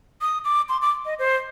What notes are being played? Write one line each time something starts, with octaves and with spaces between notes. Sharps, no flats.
D#6
D6
C6
D6
D#5
C5